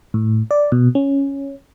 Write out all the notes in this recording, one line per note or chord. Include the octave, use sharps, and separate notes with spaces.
A2
D5
B2
C#4